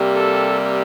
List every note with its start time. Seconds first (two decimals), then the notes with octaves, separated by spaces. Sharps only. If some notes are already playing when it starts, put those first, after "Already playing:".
Already playing: C3 G3 A#3
0.15 A4